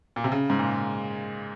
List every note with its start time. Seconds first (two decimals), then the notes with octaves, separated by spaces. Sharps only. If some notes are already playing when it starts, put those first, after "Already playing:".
0.16 A#2
0.24 C3
0.32 C#3
0.50 G#2
0.59 A#2